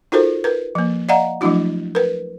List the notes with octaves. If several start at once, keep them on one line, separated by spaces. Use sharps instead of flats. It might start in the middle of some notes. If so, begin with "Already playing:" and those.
D#4 F4 F#4 A4 A#4 C5
A#4 B4
F3 A#3
D5 D#5 F5 F#5 A#5
F3 F#3 A3 D4 E4 F#4
A#4 B4